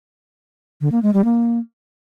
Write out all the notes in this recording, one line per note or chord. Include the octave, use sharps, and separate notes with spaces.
D3
A#3
G#3
G3
A#3